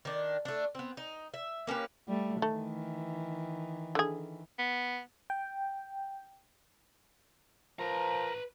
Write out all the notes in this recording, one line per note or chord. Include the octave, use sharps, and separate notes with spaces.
D#3 D4
A3 D4
B3 C4
D#4
E5
A#3 C#4 G4 B4
G3 A3
D#3 E3 A3
D3 G#4
B3
G5
F3 A#4 B4 A#5